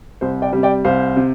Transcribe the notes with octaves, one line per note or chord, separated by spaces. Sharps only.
C2 C5
D5 G5
C3 G3
D5 G5
C2 C5 F5
C3